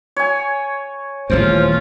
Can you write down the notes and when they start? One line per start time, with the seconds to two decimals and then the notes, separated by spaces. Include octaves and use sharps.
0.16 C#5 G#5
1.30 D#1 A1 E2 C#4 F4 C5